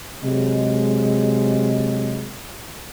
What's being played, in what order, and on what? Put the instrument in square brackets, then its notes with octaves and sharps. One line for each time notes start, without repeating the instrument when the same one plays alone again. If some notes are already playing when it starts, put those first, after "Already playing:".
[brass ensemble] C3 F#3 G#3